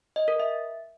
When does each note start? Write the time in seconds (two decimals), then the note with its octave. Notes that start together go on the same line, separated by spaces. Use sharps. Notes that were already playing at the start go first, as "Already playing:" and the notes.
0.16 D#5
0.28 A#4
0.40 E5